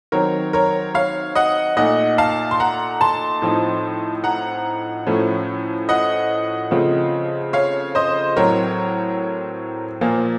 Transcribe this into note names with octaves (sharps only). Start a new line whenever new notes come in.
D#3 F#3 C4 A#4 C#5
A#4 C#5
C#5 F5
D#5 F#5
A#2 A3 D#4 D#5 F#5
F5 A5
C6
F#5 A#5
A5 C6
A2 F3 C4 D#4
F#5 A#5
A2 F3 A3 C#4
D#5 F#5
C#3 F3 A3 C4 F4
C#5 F5
C5 D#5
A2 F#3 C4 A#4 C#5
A#2 F3 A#3